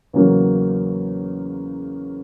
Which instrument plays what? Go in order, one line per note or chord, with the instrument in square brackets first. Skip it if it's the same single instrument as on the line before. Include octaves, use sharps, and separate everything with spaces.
[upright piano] E2 C#3 F#3 A#3